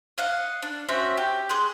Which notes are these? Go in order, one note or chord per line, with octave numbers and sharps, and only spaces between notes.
D#5 F5 F#5
D4
C4 C#4 F#4 E5
G4
G#4 C6 F#6